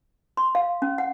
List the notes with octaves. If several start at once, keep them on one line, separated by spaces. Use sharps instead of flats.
C6
F5
C#4
F#5